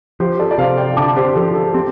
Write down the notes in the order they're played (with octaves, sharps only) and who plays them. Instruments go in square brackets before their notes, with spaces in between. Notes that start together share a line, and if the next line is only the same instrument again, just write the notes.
[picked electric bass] F3 [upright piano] G4 C5
[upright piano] A4 D5
D5
[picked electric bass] C3 [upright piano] C5 F5
[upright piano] D5 G5
[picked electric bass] D3 [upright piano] A5 D6
[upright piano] G4 C5
[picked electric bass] F3 [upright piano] A4
[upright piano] A4
[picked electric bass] C4 [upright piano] G4